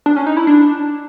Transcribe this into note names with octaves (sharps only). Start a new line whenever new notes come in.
D4
C#4
D#4
E4
D4